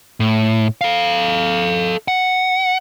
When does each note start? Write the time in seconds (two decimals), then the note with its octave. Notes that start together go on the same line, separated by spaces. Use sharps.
0.20 A2
0.81 A4 F5
2.08 F#5